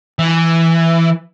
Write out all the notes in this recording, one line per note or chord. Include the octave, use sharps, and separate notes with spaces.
E3